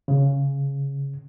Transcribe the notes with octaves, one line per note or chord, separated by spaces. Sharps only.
C#3